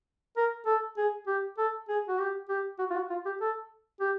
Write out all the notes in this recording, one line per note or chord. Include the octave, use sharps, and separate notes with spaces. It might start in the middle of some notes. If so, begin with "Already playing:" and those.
A#4
A4
G#4
G4
A4
G#4
F#4
G4
G4
F#4
F4
F#4
F4
G4
A4
G4